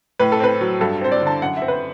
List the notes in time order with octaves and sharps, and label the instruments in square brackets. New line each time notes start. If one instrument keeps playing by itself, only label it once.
[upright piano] A2 B4
A4
C4 B4
F#3
G2 A4
C4 C5
D5
D3
A5
F#2 F#5
C4 E5
B4
C5